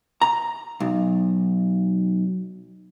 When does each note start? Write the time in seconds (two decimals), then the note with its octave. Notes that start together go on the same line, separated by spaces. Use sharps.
0.22 A#5
0.80 B1